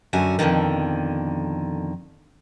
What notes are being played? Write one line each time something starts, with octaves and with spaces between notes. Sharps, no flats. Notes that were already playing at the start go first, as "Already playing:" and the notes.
F#2 D3 F#4 G#5
F2 G#2 B2 D3 D#3